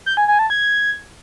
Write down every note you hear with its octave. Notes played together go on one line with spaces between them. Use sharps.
G6
G#5
G#5
A5
G#6